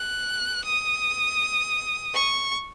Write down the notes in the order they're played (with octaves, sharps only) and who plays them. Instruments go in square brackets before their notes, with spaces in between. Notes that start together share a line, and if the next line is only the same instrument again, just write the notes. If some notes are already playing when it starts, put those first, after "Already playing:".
Already playing: [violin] F#6
D#6
C#6